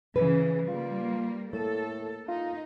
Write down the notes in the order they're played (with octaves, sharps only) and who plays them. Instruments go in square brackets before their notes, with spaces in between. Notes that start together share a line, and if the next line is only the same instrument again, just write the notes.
[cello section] C#3 E3 [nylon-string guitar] B4
[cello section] G3 A#3 [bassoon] F4
[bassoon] A2 [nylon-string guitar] A#3 [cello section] A4
[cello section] D#4 [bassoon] F4